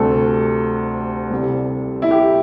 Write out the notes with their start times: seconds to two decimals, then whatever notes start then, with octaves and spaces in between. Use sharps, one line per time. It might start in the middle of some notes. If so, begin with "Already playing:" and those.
Already playing: D2 C3 G3 A4
1.31 C2 C3 G3
2.02 E4
2.11 G4